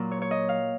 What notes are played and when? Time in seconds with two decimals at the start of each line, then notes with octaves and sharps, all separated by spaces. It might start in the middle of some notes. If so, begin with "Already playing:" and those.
Already playing: A#2 F#3 A#3
0.11 C#5
0.22 C#5
0.31 D#5
0.49 F5